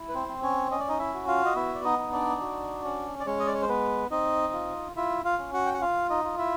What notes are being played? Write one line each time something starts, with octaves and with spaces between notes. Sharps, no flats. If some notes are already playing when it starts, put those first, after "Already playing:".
Already playing: E4
B4
C4 C5
C4
C#4 C#5
C#4 D#5
D5
D#4 D#5
E4 E5
F#4
F4 F5
D#5
B3 E4 E5
D5
D#4 D#5
D#4
D4 D5
F#4
C#4
D5
G#3 C#4 C#5
D#5
D5
C#5
C5
B3 B4
C4 D#4 D#5
F4
E4 F4 E5
F4 F5
C#4
F#4 F#5
G5
F#5
F4 F5
D#4 D#5
F4
E4 E5